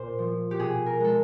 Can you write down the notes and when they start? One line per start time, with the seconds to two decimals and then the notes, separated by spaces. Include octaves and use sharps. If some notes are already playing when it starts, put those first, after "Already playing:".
Already playing: A#2 C5
0.19 F3
0.51 G4
0.59 B2 G#4
0.86 A#4
1.00 G#3 A4